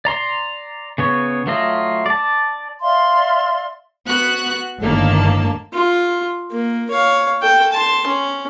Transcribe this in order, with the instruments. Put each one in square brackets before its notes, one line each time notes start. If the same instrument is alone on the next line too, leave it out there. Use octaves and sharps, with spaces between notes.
[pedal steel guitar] D5 A#5 C6
C#3 B3 C#5
F#3 A3 F4 D#5
D5 A5
[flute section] D5 E5 F5 C6
[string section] B3 F#4 F#6
G1 A2 D3 D#3 A#3 A5
[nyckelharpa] F4
A#3
C#5 F5
A4 G5
A5 C6
C#4